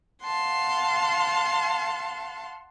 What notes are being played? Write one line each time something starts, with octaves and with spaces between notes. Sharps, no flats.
F5 F#5 A5 C6